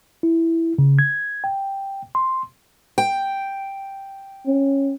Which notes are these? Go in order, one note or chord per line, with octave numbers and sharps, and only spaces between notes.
E4
C#3
G#6
G5
C6
G5
C#4